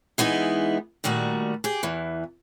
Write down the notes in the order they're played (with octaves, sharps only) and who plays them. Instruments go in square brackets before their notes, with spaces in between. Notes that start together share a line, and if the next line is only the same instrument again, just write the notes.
[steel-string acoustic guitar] E3 G#3 B3 D#4 E4
A#2 D#3 G3 A3 F#4
G4 G#4
E2 E3